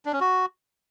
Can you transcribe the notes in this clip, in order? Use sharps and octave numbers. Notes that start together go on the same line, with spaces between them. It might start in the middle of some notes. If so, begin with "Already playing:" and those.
D4
C#4
F#4